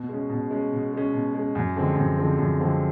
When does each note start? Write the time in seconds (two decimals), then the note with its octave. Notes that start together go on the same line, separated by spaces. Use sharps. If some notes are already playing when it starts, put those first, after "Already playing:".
Already playing: B2
0.09 G#3 C#4
0.30 B2
0.51 G#3 C#4
0.72 B2
0.93 G#3 C#4
1.13 B2
1.35 G#3 C#4
1.55 F#2
1.76 D3 F3 G#3 C4
1.96 F#2
2.18 D3 F3 G#3 C4
2.38 F#2
2.60 D3 F3 G#3 C4